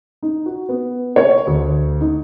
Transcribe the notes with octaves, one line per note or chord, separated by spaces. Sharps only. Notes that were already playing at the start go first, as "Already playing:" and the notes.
D#4
F#4
B3
C#5
D2
D#4